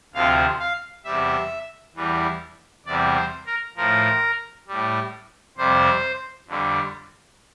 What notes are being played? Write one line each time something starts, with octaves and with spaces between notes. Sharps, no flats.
D2 C3 F3 F5
F5
E2 C3 G3 E5
E2 E3 G3
E2 C3 G3 D5
C5
A#4
A2 F3 A#4
A2 G3
F2 C3 G3 C5
F2 D3 G3